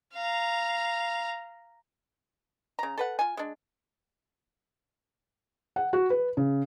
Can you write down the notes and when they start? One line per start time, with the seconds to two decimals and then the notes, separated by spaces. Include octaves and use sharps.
0.14 F5 A#5
2.79 C#3 A#5
2.98 A4 B4 F#5
3.19 F4 G#5
3.37 G#3 D4
5.76 F#5
5.93 F#4
6.10 B4
6.37 C#3